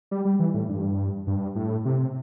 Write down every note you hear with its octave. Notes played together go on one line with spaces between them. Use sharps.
G3
G3
E3
A2
G2
G2
A2
C3